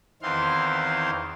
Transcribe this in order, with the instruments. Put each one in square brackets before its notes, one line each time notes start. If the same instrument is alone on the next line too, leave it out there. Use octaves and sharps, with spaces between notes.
[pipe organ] E2 D#3 E3 C4 F5 C6